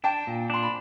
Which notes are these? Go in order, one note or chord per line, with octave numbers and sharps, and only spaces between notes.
D4 G5 A5
A#2
D4 C6
B5